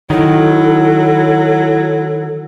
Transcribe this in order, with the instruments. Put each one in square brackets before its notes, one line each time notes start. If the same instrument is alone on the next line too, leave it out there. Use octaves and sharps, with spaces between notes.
[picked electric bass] D#3 [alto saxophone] F#3 [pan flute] E4 [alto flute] A4